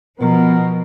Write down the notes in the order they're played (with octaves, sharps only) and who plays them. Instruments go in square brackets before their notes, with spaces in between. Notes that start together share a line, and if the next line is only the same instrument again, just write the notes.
[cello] B2 [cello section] F3 [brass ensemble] B3 A#4